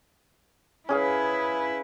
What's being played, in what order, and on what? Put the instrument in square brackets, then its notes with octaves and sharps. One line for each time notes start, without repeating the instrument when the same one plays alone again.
[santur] C#4 G#4 F5 [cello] E4 B4